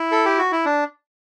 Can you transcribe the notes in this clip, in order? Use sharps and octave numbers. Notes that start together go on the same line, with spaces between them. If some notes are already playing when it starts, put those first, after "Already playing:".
Already playing: E4
A4
G4
F#4
E4
D4